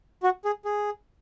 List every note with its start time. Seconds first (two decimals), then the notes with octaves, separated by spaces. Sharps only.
0.23 F#4
0.45 G#4
0.65 G#4